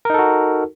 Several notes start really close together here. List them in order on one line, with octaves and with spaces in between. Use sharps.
A#4 D#4 A4 F#4